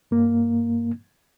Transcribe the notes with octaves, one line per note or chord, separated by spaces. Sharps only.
G2 A#3